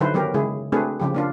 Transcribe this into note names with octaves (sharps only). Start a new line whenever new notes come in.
D3 F#3 D#4 E4 B4 C5
D#3 F#3 B3 G4 A#4
C#3 G#3 E4 G#4
A3 C4 D4 F#4 G#4 B4
C#3 F3 G4
A#3 D4 F4